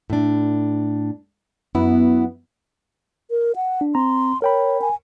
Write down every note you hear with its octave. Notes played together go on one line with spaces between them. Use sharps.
A2 D4
F#2 B3 E4
A#4
F#5
D4
C4 A#5 C6
A#4 C#5 G5 B5
G#5